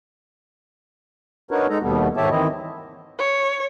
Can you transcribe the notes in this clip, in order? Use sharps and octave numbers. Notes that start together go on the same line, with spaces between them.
D4 D#4 F#4 A#4 B4 C#5
G#3 D#4 A4 A#5
D#2 B2 G3 A3 B3
G#2 D#3 G4 C#5 E5 A5
D#3 E3 C4 E4 D#5
C#5